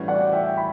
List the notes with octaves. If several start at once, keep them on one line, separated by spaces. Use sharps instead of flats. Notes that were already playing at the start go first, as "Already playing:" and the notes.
Already playing: A2 E3 G3 C#4 F#4
D5 F#5
E5 G5
B5